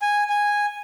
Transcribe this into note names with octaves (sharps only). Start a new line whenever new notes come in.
G#5
G#5